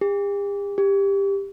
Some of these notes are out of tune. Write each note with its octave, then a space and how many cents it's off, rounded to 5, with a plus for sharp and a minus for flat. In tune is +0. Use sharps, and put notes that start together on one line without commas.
G4 +45
G4 +15